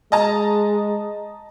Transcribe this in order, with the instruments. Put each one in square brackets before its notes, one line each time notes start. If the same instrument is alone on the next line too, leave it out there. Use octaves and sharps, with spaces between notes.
[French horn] G#3 [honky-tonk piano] D#5 A5 A#5